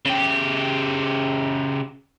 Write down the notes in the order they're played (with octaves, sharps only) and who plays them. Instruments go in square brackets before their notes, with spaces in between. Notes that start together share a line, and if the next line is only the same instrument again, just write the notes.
[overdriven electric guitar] C#3 G4